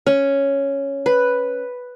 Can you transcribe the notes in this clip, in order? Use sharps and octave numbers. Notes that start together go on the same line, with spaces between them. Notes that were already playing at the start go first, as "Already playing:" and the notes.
C#4
B4